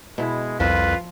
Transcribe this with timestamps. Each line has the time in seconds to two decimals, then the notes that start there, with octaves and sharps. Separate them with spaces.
0.18 B2 G#3 E4
0.60 C2 F2 F3 F4 B4